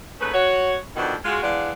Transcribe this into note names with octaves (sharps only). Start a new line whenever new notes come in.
D#2 A3 C#4 G#4 B4
F#4 C#5
F2 B2 D#3 B3 C4 D4
G#3 F4 F#4
E3 G#3 B3 D4 D5 F5